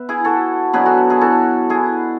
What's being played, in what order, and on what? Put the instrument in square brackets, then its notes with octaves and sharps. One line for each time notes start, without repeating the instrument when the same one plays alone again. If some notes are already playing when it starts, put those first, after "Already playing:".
Already playing: [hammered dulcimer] B3 B4 E5
E4 G#4
F#4 A4
B2 F#3 B3 D4 G#4 B4
F#4 A4
E4 G#4
F#4 A4
E4 G#4